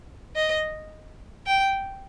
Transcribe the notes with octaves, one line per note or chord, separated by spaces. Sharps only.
D#5
G5